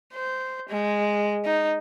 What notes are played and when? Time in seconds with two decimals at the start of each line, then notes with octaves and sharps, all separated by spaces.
0.14 C5
0.69 G#3
1.45 D#4